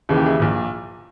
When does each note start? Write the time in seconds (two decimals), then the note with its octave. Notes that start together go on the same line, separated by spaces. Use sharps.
0.09 D#2 C#3 E3 G#4
0.17 G4
0.26 E4 G#4
0.40 A#1 A#2